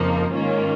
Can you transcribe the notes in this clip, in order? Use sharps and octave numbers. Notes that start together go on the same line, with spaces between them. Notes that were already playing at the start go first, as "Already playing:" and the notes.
Already playing: F2 C#3 F3 A#3 D#4
G#2 D#3 A#3 C#4 F4